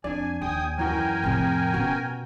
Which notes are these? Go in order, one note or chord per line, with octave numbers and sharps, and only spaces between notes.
F2 D4 D5 G#5
D#2 G5 G#5 D#6
F#2 E3 F#4 A#4 G5 G#5
F2 A2 C3
B2 C#4 F#4